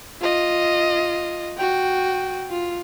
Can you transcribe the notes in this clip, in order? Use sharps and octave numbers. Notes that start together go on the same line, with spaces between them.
F4 D#5
F#4 G5
F4